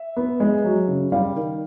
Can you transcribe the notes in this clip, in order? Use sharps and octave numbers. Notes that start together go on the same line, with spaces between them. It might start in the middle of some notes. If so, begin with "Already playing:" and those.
Already playing: E5
B3
G#3
F#3
C#3
G3 F5
D#3